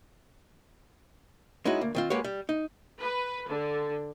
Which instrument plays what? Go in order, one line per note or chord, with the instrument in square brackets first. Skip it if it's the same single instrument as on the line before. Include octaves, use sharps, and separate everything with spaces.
[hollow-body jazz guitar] G#3 C#4 D#4 E4 F#4
D2 A#3
D#3 C4 F4
G#3 A#3 F#4 G4 B4 C#5
G3
D#4
[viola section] B4
D3